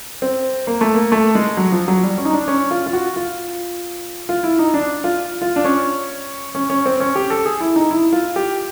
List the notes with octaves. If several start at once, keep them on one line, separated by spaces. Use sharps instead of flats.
C4
A#3
A3
A#3
A3
G#3
F#3
F3
F#3
G3
C#4
D#4
D4
C#4
F4
F4
F#4
F4
F4
E4
D#4
D4
F4
F4
D4
C#4
C#4
C#4
C4
C#4
G4
A4
G#4
E4
D#4
E4
F4
G4